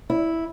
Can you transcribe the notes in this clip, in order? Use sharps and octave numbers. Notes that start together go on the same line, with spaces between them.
E4